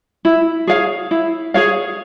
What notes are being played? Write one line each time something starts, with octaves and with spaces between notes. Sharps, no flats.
E4
G#4 C#5 F5
E4
G#4 C#5 F5